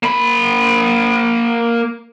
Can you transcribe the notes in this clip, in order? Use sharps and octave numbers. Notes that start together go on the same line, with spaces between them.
A#3 B5